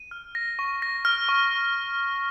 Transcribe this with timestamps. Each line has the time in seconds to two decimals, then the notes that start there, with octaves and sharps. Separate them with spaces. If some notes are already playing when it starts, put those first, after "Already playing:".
Already playing: D#7
0.11 F6
0.35 A#6
0.59 C#6
0.82 A#6
1.05 F6
1.29 C#6